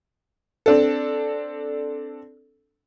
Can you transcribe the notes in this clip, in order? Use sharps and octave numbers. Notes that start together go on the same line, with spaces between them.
C4 D4 A4